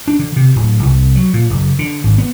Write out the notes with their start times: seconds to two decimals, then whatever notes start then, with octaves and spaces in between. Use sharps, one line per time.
0.08 D4
0.19 D3
0.36 C3
0.56 D1
0.82 C2
1.15 F#3
1.33 A#2
1.50 F#1
1.79 D3
2.04 G#1
2.18 B3